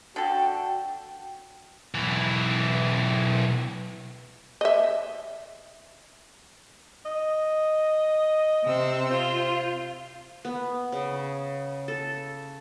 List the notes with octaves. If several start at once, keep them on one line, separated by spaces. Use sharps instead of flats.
D3 F#4 A4 G5
B1 E3
D#5 E5
D#5
C3 C4 E6
F4 C5
B3
C#3
A4